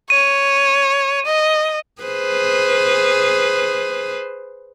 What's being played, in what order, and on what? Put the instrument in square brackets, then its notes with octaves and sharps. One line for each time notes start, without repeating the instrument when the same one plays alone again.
[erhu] C#5 [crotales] D#7
[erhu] D#5
[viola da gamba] G#4 B4 C5